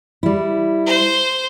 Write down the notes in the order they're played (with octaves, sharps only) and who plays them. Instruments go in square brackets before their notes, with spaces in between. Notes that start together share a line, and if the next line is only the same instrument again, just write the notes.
[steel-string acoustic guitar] G3 E4
[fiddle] C5